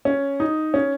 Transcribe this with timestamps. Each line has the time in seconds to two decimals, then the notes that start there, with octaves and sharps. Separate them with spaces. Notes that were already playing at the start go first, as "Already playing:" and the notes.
0.05 C#4
0.40 D#4
0.74 C#4